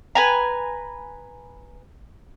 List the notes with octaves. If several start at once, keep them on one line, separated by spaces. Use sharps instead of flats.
B4 G#5 A#5